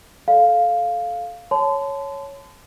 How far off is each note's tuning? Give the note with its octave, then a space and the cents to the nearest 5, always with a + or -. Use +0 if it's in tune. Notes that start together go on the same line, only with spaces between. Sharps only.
A4 -20 D5 +0 F5 +0
C#5 +0 A5 -20 C6 -40